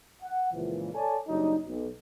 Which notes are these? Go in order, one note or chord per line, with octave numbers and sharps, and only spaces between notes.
F#5
C#2 A#2 E3 F3
A4 C#5 D5 G#5 A5
F#1 F#3 G3 D4 D#4
B1